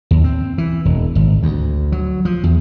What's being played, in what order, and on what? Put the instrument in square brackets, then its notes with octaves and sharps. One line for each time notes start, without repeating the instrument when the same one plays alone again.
[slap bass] D#2
C4
E3
E1
G#1
D2
F#3
F3
E2